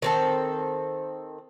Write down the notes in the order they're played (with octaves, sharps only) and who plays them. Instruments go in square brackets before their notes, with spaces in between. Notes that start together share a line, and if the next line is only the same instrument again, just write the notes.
[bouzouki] D#3 C4 A4